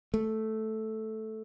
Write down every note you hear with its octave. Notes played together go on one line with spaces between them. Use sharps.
A3